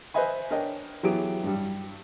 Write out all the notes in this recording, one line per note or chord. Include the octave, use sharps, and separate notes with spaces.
B4 C5 D#5 E5 G#5 B5
D4 A#4 C#5 D#5 G5
E3 F#3 B3 G4 G#4 D7
G2 G3